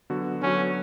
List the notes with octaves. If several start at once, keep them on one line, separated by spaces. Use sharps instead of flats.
D3 F#3 B3 F#4
D3 F#3 B3 C#4 F#4